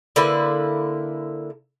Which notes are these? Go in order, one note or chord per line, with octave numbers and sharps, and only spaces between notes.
D3 A#3 E4 B4